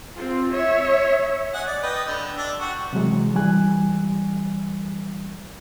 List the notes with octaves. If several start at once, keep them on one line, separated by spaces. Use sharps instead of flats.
C4 F4
C#5 E5
D#5 F#5 G#5
D5
B4 D#5 G5
D3
D4 E5
F#4 G4 F#5
C3 E3 F#3 G#3
E3 G3 G#5 F#6